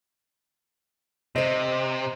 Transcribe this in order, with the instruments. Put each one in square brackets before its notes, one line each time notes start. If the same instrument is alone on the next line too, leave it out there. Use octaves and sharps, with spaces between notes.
[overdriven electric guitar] C3 [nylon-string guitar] C5 D#5